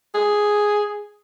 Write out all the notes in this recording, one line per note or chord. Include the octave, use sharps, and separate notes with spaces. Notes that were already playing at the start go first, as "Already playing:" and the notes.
G#4